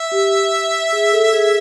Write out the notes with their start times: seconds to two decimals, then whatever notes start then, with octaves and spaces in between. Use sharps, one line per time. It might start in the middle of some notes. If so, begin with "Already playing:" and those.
Already playing: E5
0.12 G4
0.92 G#4
1.12 A4
1.33 G#4